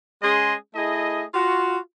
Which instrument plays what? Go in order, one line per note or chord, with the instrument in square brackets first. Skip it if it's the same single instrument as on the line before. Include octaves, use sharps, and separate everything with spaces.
[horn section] G#3 C#4 G#4 D#5 C6
A3 E4 G#4 D#5
F4 F#4